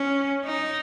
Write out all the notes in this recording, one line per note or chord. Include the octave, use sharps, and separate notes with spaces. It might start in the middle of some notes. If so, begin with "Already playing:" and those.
Already playing: C#4
D#4